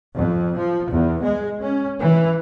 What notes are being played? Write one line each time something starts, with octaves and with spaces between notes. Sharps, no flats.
F2
F3
E2
G#3
C#4
E3